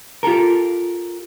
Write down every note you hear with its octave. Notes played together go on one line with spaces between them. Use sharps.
F4 G4 A4 A#4